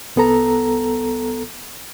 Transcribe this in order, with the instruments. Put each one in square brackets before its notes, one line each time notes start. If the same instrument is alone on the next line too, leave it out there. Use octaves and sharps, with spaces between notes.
[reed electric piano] C2 B3 A4 A#5